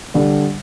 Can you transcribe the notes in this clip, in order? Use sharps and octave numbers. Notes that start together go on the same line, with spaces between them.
D3 G3 D4